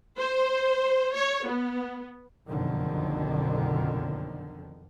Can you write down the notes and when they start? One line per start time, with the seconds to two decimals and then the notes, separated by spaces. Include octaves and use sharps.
0.18 C5
1.14 C#5
1.47 B3
2.48 F#1 B1 F2 D3 D#3